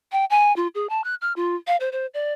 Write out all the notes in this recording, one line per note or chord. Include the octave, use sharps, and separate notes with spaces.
G5
G#5
F4
G#4
A5
F#6
F6
F4
F5
C5
C5
D5